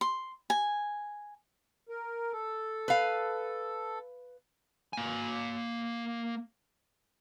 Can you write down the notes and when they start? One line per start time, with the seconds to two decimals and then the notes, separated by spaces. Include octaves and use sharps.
0.01 C6
0.50 G#5
1.89 A#4
2.33 A4
2.88 B4 F5
4.93 A#3 G#5